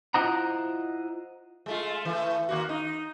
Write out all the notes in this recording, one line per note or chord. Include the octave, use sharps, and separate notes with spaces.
E4 F4 C5 D#5 F#5 A#5
G#3 A3 F4
E3 A3
D#2 A#3 F#4
D#4